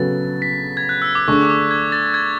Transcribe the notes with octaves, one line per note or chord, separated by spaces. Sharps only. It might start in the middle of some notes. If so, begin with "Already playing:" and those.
Already playing: C#3 F#3 B3 F#4 A4 A6
B6
G#6
F#6
E6
D6
D3 A3 D4 G#4 C#6
D6
G#6
A6
G#6